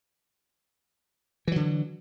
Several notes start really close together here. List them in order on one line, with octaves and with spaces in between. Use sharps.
E3 F#3 D3